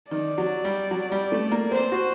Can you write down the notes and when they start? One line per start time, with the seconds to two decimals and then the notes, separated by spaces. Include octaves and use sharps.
0.11 D#3 D5
0.38 F#3
0.65 G3
0.91 F#3
1.12 G3
1.32 A3
1.52 A#3
1.71 C4 C5
1.92 F#4